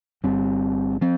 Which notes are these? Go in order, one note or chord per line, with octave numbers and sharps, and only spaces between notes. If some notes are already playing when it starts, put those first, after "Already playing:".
G1 G2 G3 C4
F3 C4